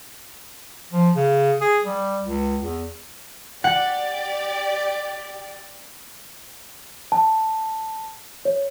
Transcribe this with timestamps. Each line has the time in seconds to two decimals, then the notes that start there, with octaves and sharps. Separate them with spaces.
0.92 F3
1.16 C#3
1.61 G#4
1.84 G3
2.23 C#2
2.61 E2
3.64 G4 D5 F#5
7.12 A5
8.45 C#5